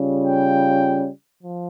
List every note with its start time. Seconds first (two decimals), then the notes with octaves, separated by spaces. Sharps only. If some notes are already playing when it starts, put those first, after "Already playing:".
Already playing: C#3 G3 C#4 F4
0.23 G5
1.40 F3